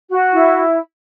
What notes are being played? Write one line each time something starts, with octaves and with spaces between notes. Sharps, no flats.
F#4
E4